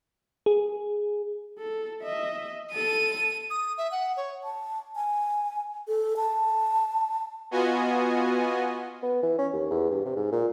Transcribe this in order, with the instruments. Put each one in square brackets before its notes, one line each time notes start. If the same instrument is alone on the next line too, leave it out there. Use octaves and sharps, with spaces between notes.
[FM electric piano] G#4
[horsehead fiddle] A4
D#5 E5
[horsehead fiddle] A4 A5 [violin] D#7
[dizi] D#6
E5
F#5
C#5
[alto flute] A5
G#5
A4
A5
[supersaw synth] B3 F4 F#4 D#5 G#5
[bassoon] B3
E3
C#4
D#2
E2
G2
C3
G#2
A#2